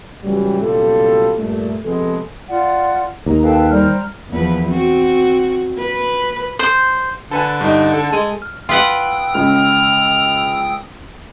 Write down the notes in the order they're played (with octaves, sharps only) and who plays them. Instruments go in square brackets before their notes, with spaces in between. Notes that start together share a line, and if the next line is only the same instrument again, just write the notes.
[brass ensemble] C#2 A2 E3 F#3 G3
F#1 B2 G3 F4 A4
G2 A#2 A3
C3 F3 G#3 B3 A4
[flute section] F4 D5 F#5
[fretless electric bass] D#2 [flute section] A#5
[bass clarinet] A4 [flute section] B4 F5 G5
[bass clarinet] G3 [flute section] C5 A#5 F6
[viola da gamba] E2 F3 B4
C4 F#4
B4
[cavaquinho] C5
[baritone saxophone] D3 [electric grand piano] A4 B4 G#5
[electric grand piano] G2 D#4
A4
[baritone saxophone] G#3
[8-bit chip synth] F6
[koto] F4 B4 F#5 [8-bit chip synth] G5 D#6 E6
[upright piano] C#2 [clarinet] F6